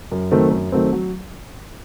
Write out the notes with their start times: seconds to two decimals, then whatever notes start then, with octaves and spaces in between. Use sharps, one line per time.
0.12 F#2
0.31 D#3 F#3 A3 C4
0.51 F#2
0.72 D#3 F#3 A3 C4
0.93 F#3